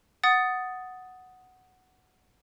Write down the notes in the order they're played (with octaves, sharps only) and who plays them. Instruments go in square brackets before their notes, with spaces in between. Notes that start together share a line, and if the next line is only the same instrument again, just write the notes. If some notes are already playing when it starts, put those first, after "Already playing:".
[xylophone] F#5 D#6 A6